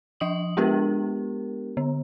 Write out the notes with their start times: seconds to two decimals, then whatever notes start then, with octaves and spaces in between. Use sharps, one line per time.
0.20 F3 D#5 D#6 F#7
0.57 G#3 B3 D4 G4 A#4
1.77 D3